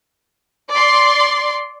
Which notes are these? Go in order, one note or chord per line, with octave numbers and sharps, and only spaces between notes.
D5 C6